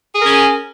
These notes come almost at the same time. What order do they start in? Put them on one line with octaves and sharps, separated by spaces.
G#4 A#4 C#4